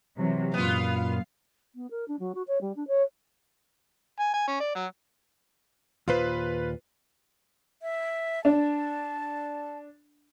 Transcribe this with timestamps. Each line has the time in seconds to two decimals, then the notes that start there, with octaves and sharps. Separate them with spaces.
0.17 C3 E3 F#3
0.54 F#2 A#2 B3 F4 F5
1.75 B3
1.90 A#4
2.08 D4
2.19 F#3
2.35 F#4
2.47 C#5
2.61 G3
2.76 D4
2.87 C#5
4.20 G#5
4.34 G#5
4.47 C#4
4.60 D5
4.75 F#3
6.08 D#2 A#2 F4 B4 C5
7.82 E5
8.45 D4 A5